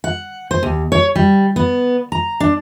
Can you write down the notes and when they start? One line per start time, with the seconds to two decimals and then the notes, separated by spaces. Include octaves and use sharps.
0.04 F#5
0.51 C5
0.63 D#2
0.92 C#5
1.16 G3
1.56 B3
2.12 A#5
2.40 D4